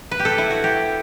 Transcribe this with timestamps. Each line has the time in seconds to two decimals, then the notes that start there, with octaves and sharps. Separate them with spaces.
0.11 B4
0.19 G4
0.25 A4
0.38 E4
0.50 F#4
0.64 G4